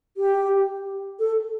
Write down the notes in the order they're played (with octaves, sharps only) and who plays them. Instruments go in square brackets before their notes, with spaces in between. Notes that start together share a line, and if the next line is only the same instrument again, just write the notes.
[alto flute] G4
A4